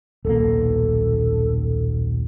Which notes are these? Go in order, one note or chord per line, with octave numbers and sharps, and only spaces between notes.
D#1 B1 A#3 A4